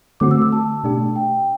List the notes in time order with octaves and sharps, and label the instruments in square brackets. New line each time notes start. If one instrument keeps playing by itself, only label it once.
[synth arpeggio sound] D3 A3 C4 F#4 [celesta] D6
[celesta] E6
E6
A5
[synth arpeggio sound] B2 A3 D4 G4
[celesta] G5